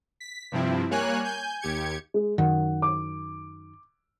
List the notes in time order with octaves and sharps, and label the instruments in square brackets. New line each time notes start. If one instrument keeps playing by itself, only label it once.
[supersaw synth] B6
G2 C3 F3 C4 E4
G3 A#3 C#5 G#5 F#6
G#5 G6
D#2 G4 G#6 C#7
[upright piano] G#3
[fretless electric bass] F#2 D#3 [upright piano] F#5
[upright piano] D6